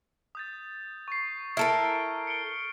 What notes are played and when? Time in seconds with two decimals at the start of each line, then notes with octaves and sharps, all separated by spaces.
0.35 D#6 G6 A6
1.08 C#6 C7
1.57 E4 A4 A#4 F6 D7
2.27 C#7 D7 G7